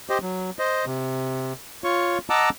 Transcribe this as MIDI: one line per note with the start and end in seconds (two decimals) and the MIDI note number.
0.10 0.18 67
0.10 0.18 72
0.10 0.18 75
0.22 0.50 54
0.59 0.85 72
0.59 0.85 75
0.86 1.53 48
1.84 2.18 65
1.84 2.18 73
1.84 2.18 85
2.30 2.50 75
2.30 2.50 78
2.30 2.50 81
2.30 2.50 82
2.30 2.50 86
2.30 2.50 88